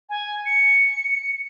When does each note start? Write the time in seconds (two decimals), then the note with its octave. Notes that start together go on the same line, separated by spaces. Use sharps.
0.09 G#5
0.46 C#7